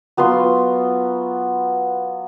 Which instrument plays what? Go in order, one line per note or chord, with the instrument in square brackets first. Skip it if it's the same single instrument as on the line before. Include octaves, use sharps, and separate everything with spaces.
[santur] F#3 B3 F4 C6